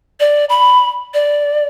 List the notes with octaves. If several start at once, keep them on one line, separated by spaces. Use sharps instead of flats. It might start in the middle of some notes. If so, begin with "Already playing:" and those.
D5
B5
D5